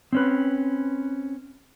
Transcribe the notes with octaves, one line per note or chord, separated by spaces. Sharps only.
C4 C#4 B4